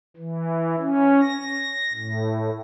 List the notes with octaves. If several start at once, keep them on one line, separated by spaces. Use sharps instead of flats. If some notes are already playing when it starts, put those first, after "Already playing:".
E3
C#4
A#6
A2